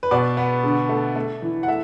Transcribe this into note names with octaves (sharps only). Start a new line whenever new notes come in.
B4
B2 D5
B3
D3
A3
A3
E3
F#5
A3 E5